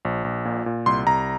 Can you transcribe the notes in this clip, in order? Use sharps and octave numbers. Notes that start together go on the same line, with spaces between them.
A#1
A#1
A#2
A#2
C2 C6
C2 A#5